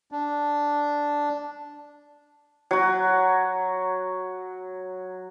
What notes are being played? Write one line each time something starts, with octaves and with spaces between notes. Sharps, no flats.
D4
F#3 F#4